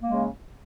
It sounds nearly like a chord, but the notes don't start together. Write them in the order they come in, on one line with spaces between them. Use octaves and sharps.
A#3 G#3 C#3